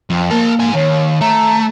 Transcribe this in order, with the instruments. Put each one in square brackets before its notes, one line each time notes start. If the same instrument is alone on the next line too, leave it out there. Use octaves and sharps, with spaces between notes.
[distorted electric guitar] F2
[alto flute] A#3 [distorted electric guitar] A#4 A5
[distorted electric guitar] G#2 G#5
[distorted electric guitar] D#2 [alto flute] C#5
[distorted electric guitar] A3 [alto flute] A#5